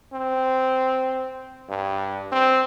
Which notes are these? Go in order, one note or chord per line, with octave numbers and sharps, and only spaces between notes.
C4
G2
C4